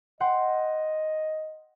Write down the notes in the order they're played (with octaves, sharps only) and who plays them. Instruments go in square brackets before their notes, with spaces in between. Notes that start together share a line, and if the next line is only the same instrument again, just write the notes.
[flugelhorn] D#5 [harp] F#5 G5 C6